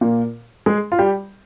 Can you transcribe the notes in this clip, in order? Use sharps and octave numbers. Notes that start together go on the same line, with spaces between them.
A#2 A#3
G#3 G#4
F4
G3 G4